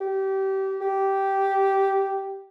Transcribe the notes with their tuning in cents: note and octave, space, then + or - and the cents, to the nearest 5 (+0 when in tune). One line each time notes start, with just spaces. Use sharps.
G4 -25
G4 -10